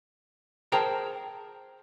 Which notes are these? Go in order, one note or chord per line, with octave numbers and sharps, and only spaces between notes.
G#4 A#4 C5 G5 A5 A#5